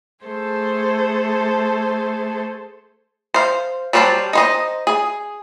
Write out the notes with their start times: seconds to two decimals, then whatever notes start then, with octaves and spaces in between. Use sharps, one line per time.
0.25 A3 G#4 A4 C5
3.34 C5 F5
3.93 F#3 G3 C5 G5 A5
4.33 D#4 C5 D#5
4.87 G#4